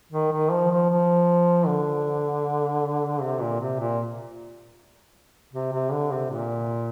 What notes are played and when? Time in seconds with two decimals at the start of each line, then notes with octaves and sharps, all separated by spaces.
0.12 D#3
0.32 D#3
0.51 F3
0.71 F3
0.90 F3
1.67 D3
3.22 C3
3.41 A#2
3.61 C3
3.80 A#2
5.53 C3
5.73 C3
5.92 D3
6.11 C3
6.30 A#2